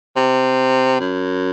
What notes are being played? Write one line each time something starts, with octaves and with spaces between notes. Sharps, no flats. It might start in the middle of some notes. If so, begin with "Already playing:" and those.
C3
F#2